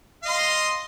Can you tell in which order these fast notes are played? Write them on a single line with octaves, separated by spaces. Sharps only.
F5 D#5 C6